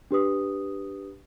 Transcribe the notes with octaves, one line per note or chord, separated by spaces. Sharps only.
D4 G4 B4 D#6